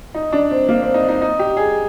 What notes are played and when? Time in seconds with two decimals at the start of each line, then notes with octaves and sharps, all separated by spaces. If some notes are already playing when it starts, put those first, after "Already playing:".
0.15 D#4
0.32 D4
0.51 C4
0.69 A#3
0.82 C4
0.94 D#4
1.08 D#4
1.22 D#4
1.39 G4
1.57 G#4